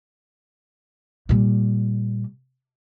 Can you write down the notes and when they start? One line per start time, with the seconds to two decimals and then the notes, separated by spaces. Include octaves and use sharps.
1.29 A#2 G3